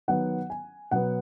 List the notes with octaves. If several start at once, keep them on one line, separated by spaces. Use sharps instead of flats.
D#3 F#3 B3 F#5
G#5
B2 F#3 B3 F#5